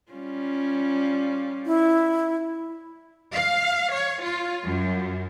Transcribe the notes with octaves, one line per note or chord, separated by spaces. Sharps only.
G3 C#4 F4
E4
F5
C#5
F4
F#2